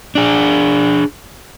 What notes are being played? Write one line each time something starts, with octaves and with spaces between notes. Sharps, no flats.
D4 G#4